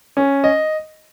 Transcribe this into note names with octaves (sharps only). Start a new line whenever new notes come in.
C#4
D#5